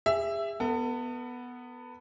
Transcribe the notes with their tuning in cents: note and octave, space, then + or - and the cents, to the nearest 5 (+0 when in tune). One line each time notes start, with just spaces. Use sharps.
G#4 -40 E5 +10
B3 +0 A4 +35